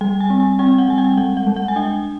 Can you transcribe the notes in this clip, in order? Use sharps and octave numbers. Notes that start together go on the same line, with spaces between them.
G3 G5
G#5
C4
G#5
C4 G5
F#5
G3 G#5
G5
G#3 F#5
F#5
G#3
F#5
G#5
D4 G5